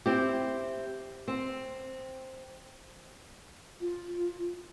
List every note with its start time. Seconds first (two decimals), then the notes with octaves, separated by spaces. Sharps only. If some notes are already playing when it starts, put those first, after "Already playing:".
0.06 C4 E4 G4
1.28 C4
3.80 F4